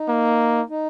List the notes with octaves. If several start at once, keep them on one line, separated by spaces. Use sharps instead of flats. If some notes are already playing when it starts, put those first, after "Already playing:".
Already playing: D#4
A#3
D#4